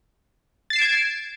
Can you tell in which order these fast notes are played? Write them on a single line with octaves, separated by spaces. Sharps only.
A6 C7 E7 D7 G#6